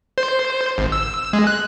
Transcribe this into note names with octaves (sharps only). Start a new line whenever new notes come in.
C5
G#1
E6
G#3
F#6